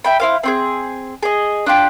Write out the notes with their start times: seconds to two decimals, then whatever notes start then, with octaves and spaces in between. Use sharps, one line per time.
0.04 E5 G5 B5
0.20 E4 C5 F5
0.43 C4 F4 G#4
1.23 G#4 D#5
1.66 D4 F4 G4